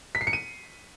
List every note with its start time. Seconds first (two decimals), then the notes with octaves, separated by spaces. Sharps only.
0.15 B6
0.21 C7
0.27 C#7
0.33 D#7